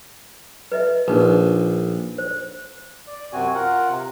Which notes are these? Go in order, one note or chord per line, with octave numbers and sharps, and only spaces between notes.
B4 D#5 E5
A#1 D4 D#4 B4
C5
D5
F#2 C3 C4 F#4 G#5
F4 A#4 F#5
C3